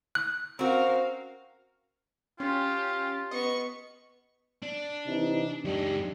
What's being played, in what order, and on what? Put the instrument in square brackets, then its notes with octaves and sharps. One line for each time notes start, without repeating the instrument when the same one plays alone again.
[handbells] F#6
[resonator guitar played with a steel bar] C4 F#4 [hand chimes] C#4 C5 [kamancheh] A#4 F5
[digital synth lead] C#4 [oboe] F4 [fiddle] G4
[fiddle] B3 C#6 [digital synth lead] D#5
[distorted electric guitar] D4
[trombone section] C3 E3 D#4
[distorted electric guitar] F#2 G#3 [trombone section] D4 D#4 G4